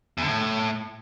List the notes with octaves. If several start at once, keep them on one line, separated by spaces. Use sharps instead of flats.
E2
D3
A2